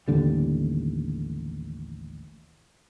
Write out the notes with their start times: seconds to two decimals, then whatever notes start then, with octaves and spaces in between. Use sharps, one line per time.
0.08 A1 D#2 D3 G3